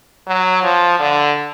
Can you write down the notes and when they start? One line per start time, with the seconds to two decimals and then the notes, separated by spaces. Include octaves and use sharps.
0.27 F#3
0.63 F3
0.99 D3